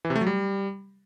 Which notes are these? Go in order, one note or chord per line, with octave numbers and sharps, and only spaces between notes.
E3
C3
A3
F#3
G3